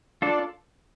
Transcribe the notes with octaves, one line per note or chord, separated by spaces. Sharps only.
D4 F4 A4